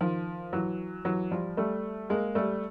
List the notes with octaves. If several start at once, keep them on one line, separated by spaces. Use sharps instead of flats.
D#3 F3
E3 F#3
E3 F#3
F3 G3
G3 A3
G#3 A#3
G3 A3